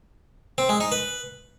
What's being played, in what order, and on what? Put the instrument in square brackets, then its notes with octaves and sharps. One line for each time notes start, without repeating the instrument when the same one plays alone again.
[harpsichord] C4
G#3
D#4
B4